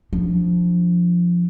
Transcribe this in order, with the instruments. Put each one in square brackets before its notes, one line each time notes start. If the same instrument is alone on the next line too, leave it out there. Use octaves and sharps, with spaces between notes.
[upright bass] F3 D4